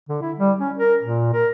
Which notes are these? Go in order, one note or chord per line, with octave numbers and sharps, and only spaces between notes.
D3
E4
G3
C#4
A#4
A#2
A#4